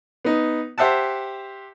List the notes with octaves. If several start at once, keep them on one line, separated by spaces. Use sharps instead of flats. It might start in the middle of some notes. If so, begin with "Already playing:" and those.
B3 D#4
G4 C5 E5 F#5 A5